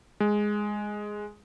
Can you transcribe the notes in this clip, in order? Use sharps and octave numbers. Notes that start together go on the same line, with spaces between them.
G#3